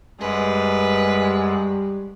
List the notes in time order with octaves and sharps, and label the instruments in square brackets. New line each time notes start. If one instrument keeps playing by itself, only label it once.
[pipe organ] F#2 [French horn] G3 [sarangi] G#3 [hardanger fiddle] B4